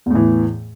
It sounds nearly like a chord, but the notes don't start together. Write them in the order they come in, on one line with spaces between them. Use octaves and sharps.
E2 A2 E3